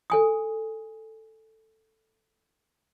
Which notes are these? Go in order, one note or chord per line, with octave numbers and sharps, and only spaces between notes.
A4 G#5 D#6